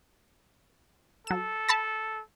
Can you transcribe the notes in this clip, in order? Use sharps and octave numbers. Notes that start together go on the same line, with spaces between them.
F#3 A4 E7
A5 B5 A6